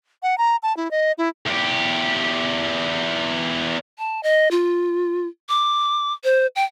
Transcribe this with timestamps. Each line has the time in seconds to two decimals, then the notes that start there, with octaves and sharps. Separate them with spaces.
0.23 F#5
0.38 A#5
0.63 A5
0.77 E4
0.91 D#5
1.18 E4
1.46 E2 G4
3.98 A5
4.23 D#5
4.51 F4
5.49 D6
6.24 C5
6.56 G5